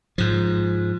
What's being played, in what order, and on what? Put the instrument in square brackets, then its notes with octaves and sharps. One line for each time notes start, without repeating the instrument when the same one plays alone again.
[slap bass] G#2 F3